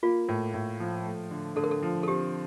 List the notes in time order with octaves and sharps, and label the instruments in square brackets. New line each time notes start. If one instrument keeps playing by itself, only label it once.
[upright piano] A#3 [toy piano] F4
[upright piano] A2
A2
F3
A3
D3
[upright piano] D3 [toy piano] A4
[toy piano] A#4
A4
[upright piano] F3
[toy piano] A4
[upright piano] C4 [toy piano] G4